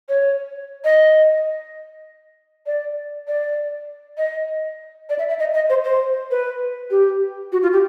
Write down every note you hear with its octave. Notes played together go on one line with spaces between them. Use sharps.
C#5
D#5
D5
D5
D#5
D5
E5
E5
D#5
D#5
C5
C5
B4
G4
F#4
F4
G4